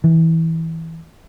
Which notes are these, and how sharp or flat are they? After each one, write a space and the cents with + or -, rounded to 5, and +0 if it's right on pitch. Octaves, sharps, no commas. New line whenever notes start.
E3 -20